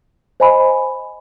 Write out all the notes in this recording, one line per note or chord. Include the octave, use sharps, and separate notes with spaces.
C5 D#5 G#5 B5